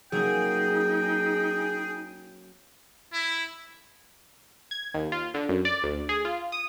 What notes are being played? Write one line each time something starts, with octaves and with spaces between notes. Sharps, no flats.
F#3 A#3 C#4 D#4 G#4 G5
E4
G#6
D#2
F4
D3
F#2
D5
D2
G#4
F4
D#6